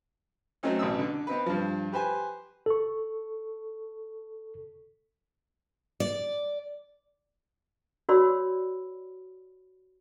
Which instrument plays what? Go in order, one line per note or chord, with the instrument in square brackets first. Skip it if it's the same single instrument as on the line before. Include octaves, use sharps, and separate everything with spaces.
[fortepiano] F#3 A3 C4 C#4 D#4
A1 B2 D#6 E6
D3
B3 C4 D#4 B4
G2 F3
G4 B4 C5 G#5
[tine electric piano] A4 C#6
[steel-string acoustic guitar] D5
[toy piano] F#4 B4 C#5 D5 B5 E6